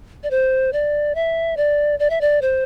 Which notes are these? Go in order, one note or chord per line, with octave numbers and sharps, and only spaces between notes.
D5
C5
D5
E5
D5
D5
E5
D5
C5